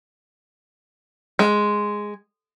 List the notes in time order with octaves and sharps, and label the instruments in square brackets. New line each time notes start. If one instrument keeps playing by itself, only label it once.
[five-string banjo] G#3